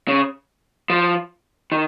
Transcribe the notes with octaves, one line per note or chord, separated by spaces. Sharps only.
C#3
F3
D#3